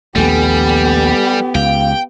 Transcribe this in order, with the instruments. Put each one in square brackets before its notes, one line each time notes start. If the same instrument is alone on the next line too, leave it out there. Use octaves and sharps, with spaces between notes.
[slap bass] A#1 D#2 A3 [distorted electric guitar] G3 [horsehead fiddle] B3 G4 [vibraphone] A4 G#5
[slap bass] C#2 [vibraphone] F5 [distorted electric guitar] G5